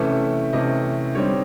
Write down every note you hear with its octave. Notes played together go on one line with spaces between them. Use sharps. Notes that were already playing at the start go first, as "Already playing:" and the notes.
Already playing: C3 E3 A3 C#4 E5
C3 E3 A3 C#4 D#5
D3 G3 C4 D#4 C#5